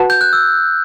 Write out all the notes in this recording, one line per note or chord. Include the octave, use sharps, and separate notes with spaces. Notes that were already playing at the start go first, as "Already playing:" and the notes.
Already playing: F#4 B4 F#5 A5
G6
F#6
E6